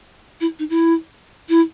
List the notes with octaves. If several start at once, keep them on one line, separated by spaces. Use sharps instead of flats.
E4
D#4
E4
E4